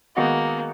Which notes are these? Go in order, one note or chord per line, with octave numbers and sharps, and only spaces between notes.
D#3 G#3 A#3 B3 D#4 F#4